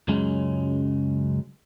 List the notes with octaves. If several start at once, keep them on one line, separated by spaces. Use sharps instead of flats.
C#2 F#2 C#3 F#3 G#3 C#4